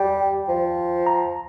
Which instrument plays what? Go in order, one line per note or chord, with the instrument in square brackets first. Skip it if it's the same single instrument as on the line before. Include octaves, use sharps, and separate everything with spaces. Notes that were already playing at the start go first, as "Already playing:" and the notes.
Already playing: [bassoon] G3 [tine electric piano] G5
[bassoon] F3
[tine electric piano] A#5